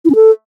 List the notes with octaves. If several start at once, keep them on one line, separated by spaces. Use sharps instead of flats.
E4
C#4
A4